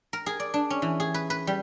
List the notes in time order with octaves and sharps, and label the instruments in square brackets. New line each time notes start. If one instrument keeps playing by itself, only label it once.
[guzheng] A#4
G#4
D5
D4
C#4
E3
G#4
B4
B4
G3